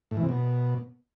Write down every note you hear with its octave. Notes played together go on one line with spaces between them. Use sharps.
A2
E3
C3
B2